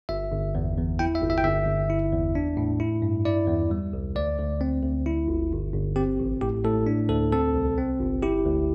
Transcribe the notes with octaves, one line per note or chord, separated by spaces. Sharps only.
G1 E5
G1
E2
E2
E4 G5
E5
G1
E5
G5
G1 E5
G1
E4
E2
D4
A2
E4
G2
E4 D5
E2
G3
C2
D2 D5
D2
C4
D2
E4
G1
G1
G1
C4 G4
A1
A2 G4
A2 A4
D4
D2 A4
C4 A4
C2
C4
G1
E4 G4
D2